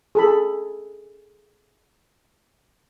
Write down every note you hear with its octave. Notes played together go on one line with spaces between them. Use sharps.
G#4 A4 B5